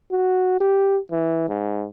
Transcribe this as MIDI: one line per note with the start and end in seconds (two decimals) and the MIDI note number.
0.11 0.56 66
0.60 0.99 67
1.11 1.44 52
1.49 1.86 44